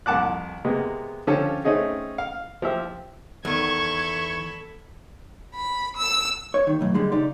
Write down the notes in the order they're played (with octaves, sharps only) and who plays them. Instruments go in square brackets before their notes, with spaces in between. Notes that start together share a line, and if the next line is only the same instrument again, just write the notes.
[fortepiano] C2 F2 F#5 A5 D6 F#6
C3 G#3 A#3 B3
D3 F3 C#4 F4 G4 A4
A3 C4 C#4 D#4 G#4
F5
F3 G4 E5
[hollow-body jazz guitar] E2 D#3 [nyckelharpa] A4 B5 [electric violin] C#6 G#6
[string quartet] B5
E6
[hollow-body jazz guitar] C#5
D#2 D#3
B1 F#2 A2
D3 G3 G#3
C#3 D#4 G4 D5